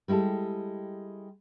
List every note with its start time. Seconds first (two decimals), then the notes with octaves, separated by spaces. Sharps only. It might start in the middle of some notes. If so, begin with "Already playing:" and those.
0.08 G3 G#3 E4 G4 A4